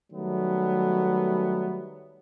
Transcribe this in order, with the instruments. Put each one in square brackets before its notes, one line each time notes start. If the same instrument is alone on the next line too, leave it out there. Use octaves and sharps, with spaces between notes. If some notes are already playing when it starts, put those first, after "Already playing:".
[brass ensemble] D#3 F#3 G3 A3 B3